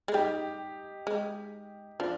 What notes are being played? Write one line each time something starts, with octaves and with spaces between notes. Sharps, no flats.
G#3
G3 D#4 G4
G#3
F3 D4 F4